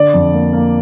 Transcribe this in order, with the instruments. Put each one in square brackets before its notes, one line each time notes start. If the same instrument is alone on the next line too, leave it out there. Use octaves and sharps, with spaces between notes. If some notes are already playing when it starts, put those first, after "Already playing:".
Already playing: [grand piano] D3 D5
F2
A#3
A#3